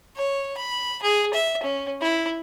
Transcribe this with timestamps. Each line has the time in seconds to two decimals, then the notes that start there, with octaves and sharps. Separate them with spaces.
0.16 C#5
0.57 B5
1.02 G#4
1.33 E5
1.62 C#4
2.01 E4